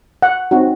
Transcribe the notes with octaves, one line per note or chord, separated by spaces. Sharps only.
F#5
C4 D#4 F#4